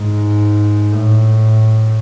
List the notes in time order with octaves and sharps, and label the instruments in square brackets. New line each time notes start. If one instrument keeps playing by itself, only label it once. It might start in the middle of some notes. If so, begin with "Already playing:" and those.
Already playing: [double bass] G#2
A2